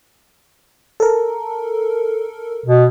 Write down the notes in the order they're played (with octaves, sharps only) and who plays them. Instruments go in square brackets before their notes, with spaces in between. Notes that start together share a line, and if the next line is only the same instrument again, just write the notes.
[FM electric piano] A4 A#4
[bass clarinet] B2